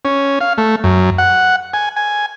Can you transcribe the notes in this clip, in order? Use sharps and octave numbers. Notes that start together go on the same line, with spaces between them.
C#4
F5
A3
F#2
F#5
G#5
G#5